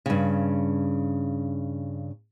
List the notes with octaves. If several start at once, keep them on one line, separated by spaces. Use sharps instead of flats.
G2 C#3